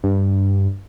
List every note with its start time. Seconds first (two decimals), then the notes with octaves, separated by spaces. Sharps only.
0.03 G2